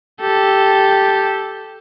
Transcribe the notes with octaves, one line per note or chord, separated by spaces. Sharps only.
G4 A4